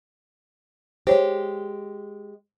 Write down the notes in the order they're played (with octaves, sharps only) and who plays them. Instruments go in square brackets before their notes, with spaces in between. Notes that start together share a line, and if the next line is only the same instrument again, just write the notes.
[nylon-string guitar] G#3 G4 [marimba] C5 C#5